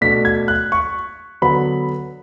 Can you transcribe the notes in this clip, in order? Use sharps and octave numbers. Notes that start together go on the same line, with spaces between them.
B2 A3 D4 B6
G#6
F#6
C#6
D3 F#3 B3 B5